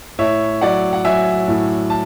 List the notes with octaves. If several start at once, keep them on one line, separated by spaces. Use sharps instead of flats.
A2 C#5 E5
F#3 D5 F#5
F#5
F#3 E5 G#5
A2
A5